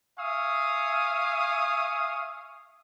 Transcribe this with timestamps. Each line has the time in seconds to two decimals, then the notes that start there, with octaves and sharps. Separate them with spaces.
0.19 E5 F5 G#5 C#6 D#6